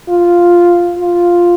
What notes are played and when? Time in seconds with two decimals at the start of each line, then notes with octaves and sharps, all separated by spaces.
0.09 F4
1.00 F4